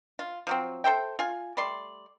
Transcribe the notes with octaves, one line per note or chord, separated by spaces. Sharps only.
F4
F3 F#3 C4
A4 C5 E5 G5
F4 G#5
G3 A3 D5 C6